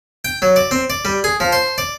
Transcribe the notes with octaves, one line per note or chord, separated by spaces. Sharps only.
G5
F#3
D5
C4
D5
G3
G#4
F3
C5
D5